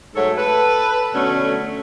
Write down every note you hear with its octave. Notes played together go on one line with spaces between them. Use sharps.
G#2 F#3 A3 A4 C#5
A4 B4
B2 D3 F#3 A3 C#4